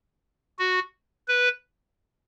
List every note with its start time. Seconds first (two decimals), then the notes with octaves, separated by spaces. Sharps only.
0.59 F#4
1.28 B4